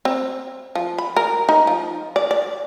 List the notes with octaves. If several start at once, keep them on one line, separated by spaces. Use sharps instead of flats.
C4
F3
B5
A#4
D#4
F3
D5
D5